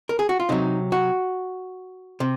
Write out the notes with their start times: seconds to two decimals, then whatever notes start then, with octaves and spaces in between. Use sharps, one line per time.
0.09 A#4
0.19 G#4
0.29 F#4
0.40 F4
0.49 C3 F#3 D#4
0.92 F#4
2.20 C3